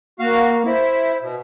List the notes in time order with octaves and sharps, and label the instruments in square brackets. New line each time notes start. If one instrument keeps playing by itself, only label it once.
[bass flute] A#3 [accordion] F#4 F5
[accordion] E4 [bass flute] C5
[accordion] B2